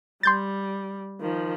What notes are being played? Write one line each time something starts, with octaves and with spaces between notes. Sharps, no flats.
G3 C6 G6 A6
D#3 F3